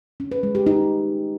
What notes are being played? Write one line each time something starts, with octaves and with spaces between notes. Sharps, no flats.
C#4
B4
G#3
G4
D#4